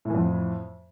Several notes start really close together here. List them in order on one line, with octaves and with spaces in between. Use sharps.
A2 E3 F2